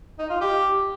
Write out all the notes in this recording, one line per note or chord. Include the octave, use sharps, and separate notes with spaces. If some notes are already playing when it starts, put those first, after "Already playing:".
D#4
F4
G4